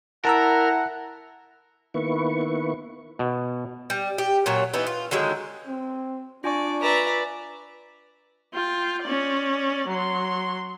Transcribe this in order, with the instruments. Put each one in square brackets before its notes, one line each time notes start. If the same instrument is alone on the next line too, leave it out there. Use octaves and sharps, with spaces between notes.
[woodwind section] E4 F#5 [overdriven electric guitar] A#4 [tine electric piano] A5 A#5 E6
[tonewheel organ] D#3 A#3 B3 E4 B4 C#6
[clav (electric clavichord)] B2
[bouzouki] G3
G4
A#2 F#3 C#5
E3 B3 D#4
F4
D3 D#3 F#3 G#3
[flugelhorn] C4
[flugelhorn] D4 [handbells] F4 G#5 C#6 [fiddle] D5
[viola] B4 D5 [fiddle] E5 A#5
[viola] F4 G5
C#4 D5
F#3 C6